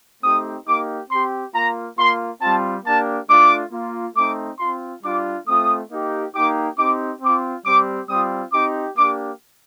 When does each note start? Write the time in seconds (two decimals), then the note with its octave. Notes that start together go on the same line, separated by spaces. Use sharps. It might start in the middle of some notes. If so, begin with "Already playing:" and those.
0.24 A3 C4 D#4 G4 D#6
0.67 A#3 D#4 G4 D6
1.11 C4 G4 C6
1.54 A#3 F4 A#5
1.98 A#3 F4 C6
2.42 G3 C4 F4 A5
2.85 A#3 D4 G4 A5
3.30 A3 D4 F4 D6
3.72 A#3 F4
4.17 A3 C4 D#4 D6
4.60 C4 F4 C6
5.04 G3 D4 F4 D6
5.48 A3 C4 F4 D#6
5.92 A#3 D#4 G4
6.35 A#3 D#4 G4 D6
6.78 C4 D#4 G4 D6
7.22 C4 F4 D6
7.65 G3 C4 G4 D6
8.09 G3 C4 F4 D#6
8.53 C4 D#4 G4 D6
8.97 A#3 D4 G4 D6